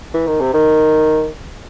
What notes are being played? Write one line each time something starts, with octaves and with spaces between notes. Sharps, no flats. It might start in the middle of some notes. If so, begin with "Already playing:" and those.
E3
D#3
C3
D#3